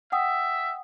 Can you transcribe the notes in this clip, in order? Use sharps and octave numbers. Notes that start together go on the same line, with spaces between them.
E5 F#5 G5 D#6